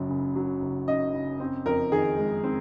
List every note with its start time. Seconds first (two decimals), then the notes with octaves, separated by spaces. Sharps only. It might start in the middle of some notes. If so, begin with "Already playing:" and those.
Already playing: F#1 F#2 F#3
0.09 C#3
0.36 F#3
0.61 F#1
0.88 F#2 D#5
1.13 C#3
1.40 C4
1.66 F2 A#4
1.92 D#3 G#4
2.18 G#3
2.44 C4